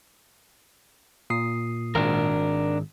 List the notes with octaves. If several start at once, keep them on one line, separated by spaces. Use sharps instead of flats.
A#2 D#6 C7
G#1 D4 A#4